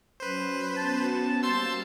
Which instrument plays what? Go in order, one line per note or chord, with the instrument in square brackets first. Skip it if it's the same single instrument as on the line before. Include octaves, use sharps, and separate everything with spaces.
[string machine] F#3 C#4 [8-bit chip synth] B4 C5
[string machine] B3 C#4 F#4 [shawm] A5
[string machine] G3 A#3 F5 [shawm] C5 [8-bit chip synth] A5 C6 E6